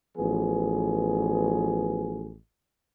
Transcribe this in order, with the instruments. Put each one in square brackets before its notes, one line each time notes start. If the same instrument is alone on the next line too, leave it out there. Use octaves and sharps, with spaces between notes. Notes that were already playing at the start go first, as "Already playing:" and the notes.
[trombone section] A1 F3 B3 G#4